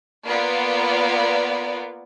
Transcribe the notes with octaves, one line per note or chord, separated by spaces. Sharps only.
A#3 B3 F4 D5